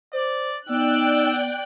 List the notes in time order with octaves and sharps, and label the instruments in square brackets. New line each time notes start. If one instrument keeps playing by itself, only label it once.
[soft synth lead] C5 [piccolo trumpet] D5
[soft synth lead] B3 [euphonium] D#4 [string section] D5 G5 F#6 [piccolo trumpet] E6